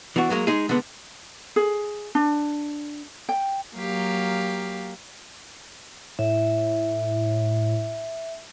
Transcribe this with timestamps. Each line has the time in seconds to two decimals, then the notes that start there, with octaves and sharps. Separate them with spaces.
0.16 E3 B3 D4 F#4
0.30 F#3 G#3 A#3
0.47 G#3 D#4 G#4
0.69 D3 G#3 B3
1.56 G#4
2.15 D4
3.29 G5
3.75 F#3 A#3 G4 F5
6.19 A2 E5